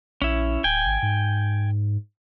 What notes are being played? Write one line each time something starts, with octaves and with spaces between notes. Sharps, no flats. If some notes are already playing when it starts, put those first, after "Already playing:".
A#1 C#4 E4
D1 G5 G#5
G#1
G#2